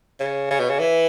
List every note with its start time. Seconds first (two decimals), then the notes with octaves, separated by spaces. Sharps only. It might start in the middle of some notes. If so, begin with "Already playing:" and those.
0.20 C#3
0.50 C#3
0.60 B2
0.70 C#3
0.79 E3